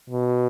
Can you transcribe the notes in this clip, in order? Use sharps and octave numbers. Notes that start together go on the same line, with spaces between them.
B2